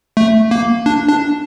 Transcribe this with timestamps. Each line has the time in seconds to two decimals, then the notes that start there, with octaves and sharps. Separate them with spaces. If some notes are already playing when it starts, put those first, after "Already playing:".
0.17 A3
0.51 A#3
0.86 D4
1.09 D4